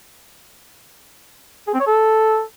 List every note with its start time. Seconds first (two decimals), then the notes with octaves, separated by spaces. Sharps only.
1.67 G#4
1.74 C4
1.80 C#5
1.87 A4